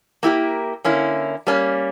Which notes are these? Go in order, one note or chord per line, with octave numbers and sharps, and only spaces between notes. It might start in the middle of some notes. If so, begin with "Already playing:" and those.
A#3 E4 G4 A#4
D3 A#3 C#4 E4
G3 A#3 C#4